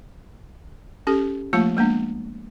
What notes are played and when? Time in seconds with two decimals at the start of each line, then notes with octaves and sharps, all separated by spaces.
1.07 C#4 G4 A4
1.53 F3 A3 A#3 F4 A5
1.77 G#3 A#3 B3 D4